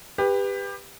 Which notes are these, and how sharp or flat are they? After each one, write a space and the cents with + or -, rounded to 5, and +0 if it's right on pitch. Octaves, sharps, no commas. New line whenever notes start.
G4 +25 B4 +0